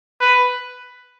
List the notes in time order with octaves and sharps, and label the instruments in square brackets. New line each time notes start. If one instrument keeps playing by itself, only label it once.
[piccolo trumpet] B4